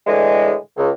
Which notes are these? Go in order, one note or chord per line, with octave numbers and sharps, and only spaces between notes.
A2 D3 E3 G#3
C#2